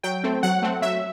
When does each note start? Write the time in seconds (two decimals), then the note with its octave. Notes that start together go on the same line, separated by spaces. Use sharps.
0.03 F#3 G5
0.24 A3 C4
0.43 F#3 F#5
0.62 A3 C4
0.82 F#3 E5